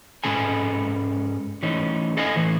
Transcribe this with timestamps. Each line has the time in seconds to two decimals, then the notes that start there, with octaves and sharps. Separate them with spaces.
0.24 G#2 D#3 G#3 C#4 A4 G#5
1.63 E3 A3 C#4 D#4
2.17 A4 D#5 F5 G#5
2.36 A2 E3